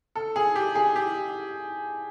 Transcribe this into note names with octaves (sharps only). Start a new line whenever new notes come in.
A4
G#4
G4
G#4
G4